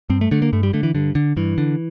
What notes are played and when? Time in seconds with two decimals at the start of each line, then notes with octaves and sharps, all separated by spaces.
0.10 G2 C4
0.21 A3
0.31 D3 A3
0.42 A#3
0.53 G2 A3
0.63 G3
0.73 D3 A3
0.83 E3
0.95 G2 D3
1.15 D3
1.37 G2 E3
1.58 D3